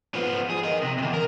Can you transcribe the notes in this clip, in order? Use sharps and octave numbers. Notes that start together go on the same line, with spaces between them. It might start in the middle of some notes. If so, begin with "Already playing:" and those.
F3 B3
G#4
A#4 D#5
C3
E2 C3
A#4